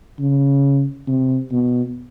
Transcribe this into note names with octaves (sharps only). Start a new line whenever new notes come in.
C#3
C3
B2